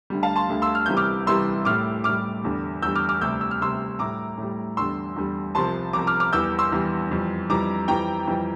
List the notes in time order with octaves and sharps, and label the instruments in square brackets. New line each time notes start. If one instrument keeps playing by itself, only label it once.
[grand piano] D2 D3 G3
F5 A5
A5 C6
D2 D3 G3
C6 E6
F6
C2 C3 E3 G3 G6
D6 F6
C2 C3 E3 G3 C6 E6
A2 G3 D6 F6
A2 G3 D6 F6
E2 D3 G3
E2 D3 G3 E6 G6
D6 F6
D6 F6
D2 C3 G3 E6 G6
E6
F6
D2 C3 G3 C6 E6
A2 G3 A#5 D6
A2 G3
E2 D3 G3 C6 E6
E2 D3 G3
C2 C3 F3 A5 C6
C2 C3 F3 A#5 D6
D6 F6
D6 F6
E2 E3 G3 E6 G6
C6 E6
E2 E3 G3
F2 E3 G3
F2 E3 G3 A#5 D6
F2 E3 G3 G5 A#5
F2 E3 G3